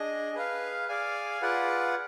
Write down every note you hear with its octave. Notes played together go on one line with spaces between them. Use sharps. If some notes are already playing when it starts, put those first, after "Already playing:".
Already playing: D4 G#4 D#5
G#4 B4 F5
G#4 D5 F5 G#5
F4 G#4 B4 D5 F#5